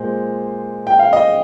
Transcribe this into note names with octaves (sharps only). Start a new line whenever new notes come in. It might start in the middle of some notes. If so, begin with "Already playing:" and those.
Already playing: A#2 G#3 C5
G5
F5
D#5